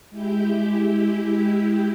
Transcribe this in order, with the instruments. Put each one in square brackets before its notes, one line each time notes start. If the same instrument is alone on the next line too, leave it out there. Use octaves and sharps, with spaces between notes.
[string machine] G#3 E4 G4 G6